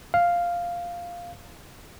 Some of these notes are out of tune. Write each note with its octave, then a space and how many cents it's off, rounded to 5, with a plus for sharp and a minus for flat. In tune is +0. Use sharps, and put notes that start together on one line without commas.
F5 +0